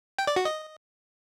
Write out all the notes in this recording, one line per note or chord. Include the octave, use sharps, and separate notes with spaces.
G5
D5
F#4
D#5